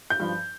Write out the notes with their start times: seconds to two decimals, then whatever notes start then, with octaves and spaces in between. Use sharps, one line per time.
0.10 G6
0.20 G2 F3